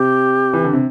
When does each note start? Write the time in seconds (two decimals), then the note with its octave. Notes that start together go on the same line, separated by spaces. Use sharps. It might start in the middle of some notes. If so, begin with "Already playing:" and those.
Already playing: C3 G4
0.53 E3
0.64 D3
0.73 C3